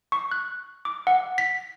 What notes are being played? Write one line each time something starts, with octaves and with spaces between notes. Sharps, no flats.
C#6
F#6
D6
F#5
B6